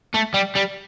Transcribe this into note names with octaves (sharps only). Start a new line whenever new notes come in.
A3
G3
G3